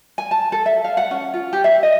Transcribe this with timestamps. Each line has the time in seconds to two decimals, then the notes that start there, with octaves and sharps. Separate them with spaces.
0.18 G#5
0.31 A5
0.52 A4
0.66 E5
0.85 F5
0.97 F#5
1.11 C#4
1.34 F4
1.53 G4
1.64 E5
1.83 D#5